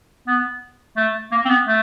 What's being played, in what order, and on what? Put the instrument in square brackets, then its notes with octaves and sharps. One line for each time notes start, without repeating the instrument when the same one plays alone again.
[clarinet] B3
A3
A#3
C4
B3
A3